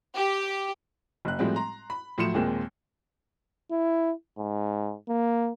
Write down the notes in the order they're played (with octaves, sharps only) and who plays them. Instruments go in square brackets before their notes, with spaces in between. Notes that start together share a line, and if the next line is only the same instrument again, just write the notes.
[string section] G4
[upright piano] F#1 F#6
A2 F3 G3 G#3 C4 F#4
A#5 C6
B5
A2 F3 F#3 C6 C#7 E7
D#2 A#2 G#3 A#3 C4
[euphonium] E4
G#2
A#3